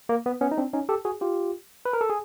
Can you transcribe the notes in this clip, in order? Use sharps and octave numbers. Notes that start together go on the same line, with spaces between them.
A#3
B3
B3 C#4
D#4
C4 D4
C#4 D#4
G4 A4
F#4 G#4
F4 G4
B4
A#4
A4
G#4